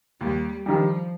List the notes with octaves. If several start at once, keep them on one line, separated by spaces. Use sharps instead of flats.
D#2 G3
D#3 F3 G3